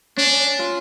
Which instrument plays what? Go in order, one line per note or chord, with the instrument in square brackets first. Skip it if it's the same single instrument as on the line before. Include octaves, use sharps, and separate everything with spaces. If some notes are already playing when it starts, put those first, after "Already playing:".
[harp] C#4 [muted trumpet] D4
[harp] F4